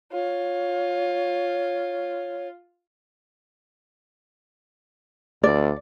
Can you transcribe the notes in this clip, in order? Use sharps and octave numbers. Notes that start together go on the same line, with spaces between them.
F4 C#5
D2 D5